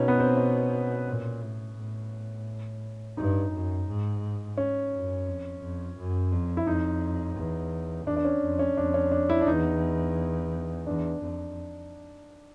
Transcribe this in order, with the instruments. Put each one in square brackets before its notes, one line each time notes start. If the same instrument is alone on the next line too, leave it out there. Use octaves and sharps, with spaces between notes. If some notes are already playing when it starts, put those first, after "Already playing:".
Already playing: [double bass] B2 [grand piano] C#4 D#4
[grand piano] B3
C4
C#4
[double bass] A#2
A2
A2
[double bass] G2 [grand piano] D#4
[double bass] F#2
G#2
[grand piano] C#4
[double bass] F#2
F2
F2
F#2
F2
[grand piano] E4
[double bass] F2 [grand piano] D#4
[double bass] E2
[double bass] E2 [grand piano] D4
[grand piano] D4
C#4
[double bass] F2
[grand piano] C#4
[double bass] F2 [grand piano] D4
[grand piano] C#4
D4
E4
D4
[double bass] E2 [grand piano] D#4
[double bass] E2 [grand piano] D4
[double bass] F2